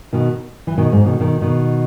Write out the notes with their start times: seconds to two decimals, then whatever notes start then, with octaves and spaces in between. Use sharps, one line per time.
0.13 B2 D#3
0.67 E3
0.78 B2 D#3
0.92 G#2
1.05 B2 D#3
1.20 B2 D#3
1.42 B2 D#3